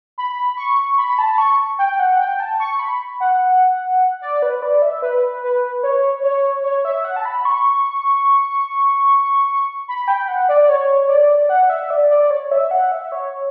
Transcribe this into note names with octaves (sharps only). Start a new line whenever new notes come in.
B5
C#6
B5
B5
A5
C#6
G5
F#5
G5
A5
C#6
B5
F#5
D5
B4
D5
E5
B4
B4
C#5
C#5
C#5
E5
F#5
A5
B5
C#6
B5
G5
F#5
D5
C#5
D5
F#5
E5
D5
D5
C#5
E5
F#5
E5
C#5